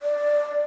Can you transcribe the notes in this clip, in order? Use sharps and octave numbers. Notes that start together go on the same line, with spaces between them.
D5